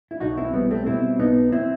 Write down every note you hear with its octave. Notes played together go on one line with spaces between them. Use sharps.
E4
B1 D#4 F#4
C4 E4
G3 B3
A3 C4
B2 C4 E4
B1 B3 D#4
C4 E4